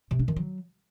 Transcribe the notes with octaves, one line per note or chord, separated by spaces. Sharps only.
C3
D4
D#3
F#3